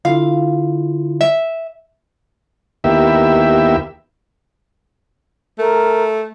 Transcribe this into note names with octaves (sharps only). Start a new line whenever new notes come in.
D3 E4 F4 F5
E5
D#2 A#3 B3 E4 G4 E5
A3 A#4